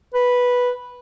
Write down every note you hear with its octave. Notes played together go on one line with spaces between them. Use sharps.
B4